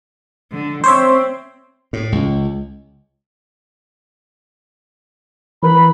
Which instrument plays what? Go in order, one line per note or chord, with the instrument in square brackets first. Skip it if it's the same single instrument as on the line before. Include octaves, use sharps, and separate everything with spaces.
[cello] D3
[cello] C4 [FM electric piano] C5 C#5 E5
[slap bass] A2
C#2
[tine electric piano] E3 A#4 B4 [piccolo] B5